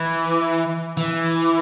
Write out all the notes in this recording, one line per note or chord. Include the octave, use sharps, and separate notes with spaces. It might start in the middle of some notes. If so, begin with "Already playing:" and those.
Already playing: E3
E3